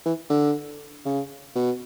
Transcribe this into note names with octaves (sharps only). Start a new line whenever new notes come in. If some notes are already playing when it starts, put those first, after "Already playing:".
E3
D3
C#3
B2